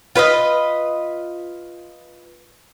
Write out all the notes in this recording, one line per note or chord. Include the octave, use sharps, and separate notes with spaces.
F4 B4 C#5 D#5